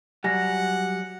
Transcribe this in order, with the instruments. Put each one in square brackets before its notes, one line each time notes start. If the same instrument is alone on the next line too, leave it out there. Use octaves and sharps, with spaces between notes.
[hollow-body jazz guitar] F#3 G3 [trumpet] F#5 [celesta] G#5 A#6